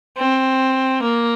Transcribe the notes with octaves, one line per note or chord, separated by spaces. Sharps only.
C4
A#3